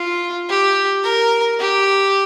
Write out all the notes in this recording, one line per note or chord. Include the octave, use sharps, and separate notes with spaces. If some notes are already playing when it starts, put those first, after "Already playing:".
Already playing: F4
G4
A#4
G4